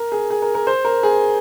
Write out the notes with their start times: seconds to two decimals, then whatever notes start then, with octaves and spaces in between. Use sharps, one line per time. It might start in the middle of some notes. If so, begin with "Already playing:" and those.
Already playing: A#4
0.12 G#4
0.30 G#4
0.42 A#4
0.55 A#4
0.67 C5
0.85 A#4
1.03 G#4